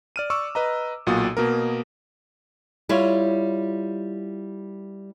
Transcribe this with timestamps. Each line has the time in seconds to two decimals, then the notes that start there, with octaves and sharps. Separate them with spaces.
0.16 D5 F6 D#7
0.30 D5 C#6 D6 E6
0.55 B4 D#5 A#5
1.07 B1 A#2 F#4 D#6
1.37 B2 A#3 A#4
2.89 G3 E4 F4 C#5